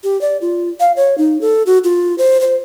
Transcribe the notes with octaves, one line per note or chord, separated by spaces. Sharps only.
G4
D5
F4
F5
C#5
D#4
A4
F#4
F4
C5
C5